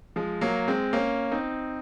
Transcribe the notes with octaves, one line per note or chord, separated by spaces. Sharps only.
F3 G#3
F#3 A#3
G#3 C4
A#3 C#4
C4 D#4